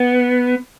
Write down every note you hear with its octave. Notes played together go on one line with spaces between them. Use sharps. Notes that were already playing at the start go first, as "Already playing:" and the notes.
Already playing: B3